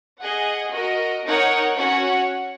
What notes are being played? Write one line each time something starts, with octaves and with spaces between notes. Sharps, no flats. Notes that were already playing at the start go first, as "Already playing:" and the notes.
G#4 D#5 F#5
F#4 A#4 D#5
D#4 A#4 C#5 F#5
C#4 F#4 C#5 F#5